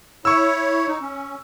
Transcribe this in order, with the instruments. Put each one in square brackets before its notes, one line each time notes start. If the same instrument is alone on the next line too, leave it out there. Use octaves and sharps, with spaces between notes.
[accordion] E4 C#5 [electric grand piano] C#6 E6
[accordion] D#4
C#4